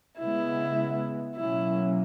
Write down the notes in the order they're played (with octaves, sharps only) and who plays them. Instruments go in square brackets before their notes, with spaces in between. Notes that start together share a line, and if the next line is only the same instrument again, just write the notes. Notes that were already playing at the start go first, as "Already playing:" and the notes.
[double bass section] C#3 G#3 B3 [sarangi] E4
[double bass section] B2 F#3 A#3 C#4 [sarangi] E4